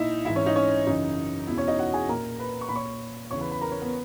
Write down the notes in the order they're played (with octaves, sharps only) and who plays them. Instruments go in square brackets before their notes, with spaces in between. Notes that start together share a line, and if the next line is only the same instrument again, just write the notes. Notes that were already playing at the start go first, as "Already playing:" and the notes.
Already playing: [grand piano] A#2 D#4 E4 E5
G#2 E3 E4 E5
C#4 C#5
D#4 D#5
C#4 C#5
F#2 C#3 E3 D#4
E2 B2 E4
C#4 C#5
D#4 D#5
F#4 F#5
G#4 G#5
A#2 A#4 A#5
B4 B5
C#6
A#2 B5
C#5 C#6
E2 C#3 E3 C#5 C#6
B4 B5
B4 B5
A#4 A#5
C#4 C#5
B3 B4